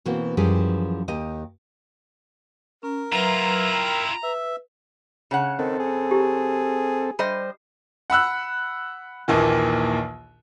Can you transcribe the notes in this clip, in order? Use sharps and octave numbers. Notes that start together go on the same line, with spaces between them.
B2 E3 A#3 C4 F#4
F#2 E3 F3 G3 G4 G#4
D#2 G4 D#5
C#4 A#4
F#3 E4 F4 B4 E5 A#5
G5
B4 E5
C#3 C#5 F#5
D#3 C4 A4
G#4
E4 G4
G3 C5 D#5
F#5 B5 E6 F#6
A#1 D#2 A#2 D#3 E3